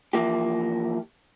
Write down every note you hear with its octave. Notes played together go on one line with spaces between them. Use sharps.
E3 F3 A#3 G4